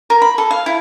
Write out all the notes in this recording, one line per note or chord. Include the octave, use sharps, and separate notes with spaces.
A#4
B5
A4
F5
E4